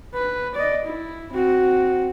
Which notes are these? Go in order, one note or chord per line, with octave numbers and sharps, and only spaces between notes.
B4
D5 D#5
E4
C4 F#4